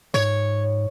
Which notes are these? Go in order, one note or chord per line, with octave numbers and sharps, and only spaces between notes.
G#2 C#5